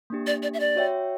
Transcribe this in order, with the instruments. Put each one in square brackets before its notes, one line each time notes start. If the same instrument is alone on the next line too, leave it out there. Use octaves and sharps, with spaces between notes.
[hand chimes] A#3 D4 G4
[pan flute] D5
D5
E5
D5
[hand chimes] F#4 C#5 E5 G5